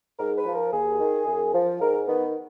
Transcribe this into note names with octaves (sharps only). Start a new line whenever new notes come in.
G#2 A#4
B4
F3
A#4
D#2 G#4
D#3
F#2
F3
G#2 A#4
D#3 B3